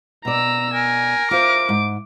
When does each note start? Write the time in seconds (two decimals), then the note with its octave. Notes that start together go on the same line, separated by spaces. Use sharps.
0.25 B2 D5 A#5 E6
0.74 A#4 G#5
1.31 F4 C5 E5 D6
1.69 G#2